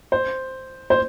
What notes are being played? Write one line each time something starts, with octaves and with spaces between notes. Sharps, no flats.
C5
C5